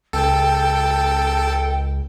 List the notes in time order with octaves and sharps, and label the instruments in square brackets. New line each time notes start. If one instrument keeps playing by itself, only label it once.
[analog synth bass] C#2 [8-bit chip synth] A4 [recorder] G5